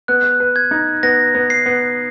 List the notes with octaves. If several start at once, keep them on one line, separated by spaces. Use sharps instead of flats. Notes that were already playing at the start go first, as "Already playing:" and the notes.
B3 F#6
B4
G#6
D#4
B3 A#6
B3
C7
B3